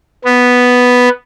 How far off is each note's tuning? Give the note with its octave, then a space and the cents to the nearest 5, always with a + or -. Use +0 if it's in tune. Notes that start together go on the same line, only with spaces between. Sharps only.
B3 +0